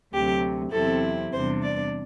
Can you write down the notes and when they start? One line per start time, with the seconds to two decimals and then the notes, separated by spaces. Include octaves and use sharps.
0.13 D2 C3 F#3 G4
0.72 E2 C3 F#3 C4 E4 A4
1.33 E2 C3 G3 D4 C5
1.62 D5